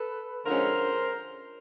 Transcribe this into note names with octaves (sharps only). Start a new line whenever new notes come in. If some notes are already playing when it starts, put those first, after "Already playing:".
Already playing: A4 B4
D3 F3 G#3 C#4 A#4 C5